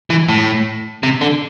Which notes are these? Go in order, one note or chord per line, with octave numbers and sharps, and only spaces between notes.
E3
A2
C3
D3